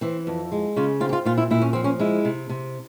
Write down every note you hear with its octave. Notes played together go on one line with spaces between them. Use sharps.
E3 C4
F2
G#3
C#3 F4
C4 F4
G4
F4
A#2 F4
E4
A#2 E4
C#4
F3 C4
C#4
G#3 E4
C3
C3